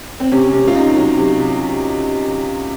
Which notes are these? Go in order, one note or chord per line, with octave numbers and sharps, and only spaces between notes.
C4
C3 C#4
C3 C#4
F4
C3 D#4
F#3
C3